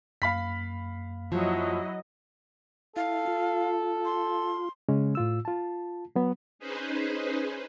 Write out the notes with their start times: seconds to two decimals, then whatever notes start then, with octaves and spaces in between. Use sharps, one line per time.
0.22 F#2 A#3 F5 B5 B6
1.32 F3 F#3 E4 D#5
2.96 E4 A4 F5
3.27 F4
4.05 C6
4.89 C#3 G#3 C#4
5.15 A2 F4 E6
5.45 F4 A5
6.16 F#3 B3
6.59 C#4 D#4 G#4 B4 C5